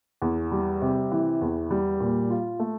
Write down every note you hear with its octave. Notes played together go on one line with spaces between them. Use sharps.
E2
G3
C3
E3
E2
G3
A#2
F4
A3